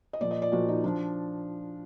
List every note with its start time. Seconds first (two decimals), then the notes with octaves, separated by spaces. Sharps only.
0.13 D#5
0.21 A#2 F3 D5
0.31 D#5
0.42 D5
0.52 A#2 F3 F#4
0.68 D#4
0.84 F3 D4